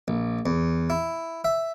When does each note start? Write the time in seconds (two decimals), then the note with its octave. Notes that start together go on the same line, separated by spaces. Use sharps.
0.08 A#1
0.46 E2
0.90 E4
1.45 E5